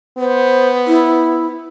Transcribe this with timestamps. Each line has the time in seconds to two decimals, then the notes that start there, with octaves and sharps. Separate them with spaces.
0.18 B3 C5
0.87 E4